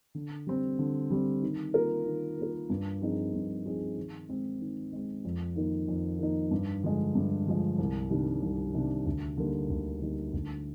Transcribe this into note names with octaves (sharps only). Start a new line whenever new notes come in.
D3
G3 C4
D3
G3 C4
D#3
A#3 F4 A#4
D#3
A#3 F4 A#4
G2
F3 C4 D#4 G#4
G2
F3 C4 D#4 G#4
D#3
G#3 C4
D#3
G#3 C4
F2
D#3 A#3 D#4
F2
D#3 A#3 D#4
G2
D3 F3 G#3
G2
D3 F3 G#3
C2
C3 D#3 G3 D4
C2
C3 D#3 G3 D4
D2
D3 G3 A#3 D#4
D2
D3 G3 A#3 D#4
D2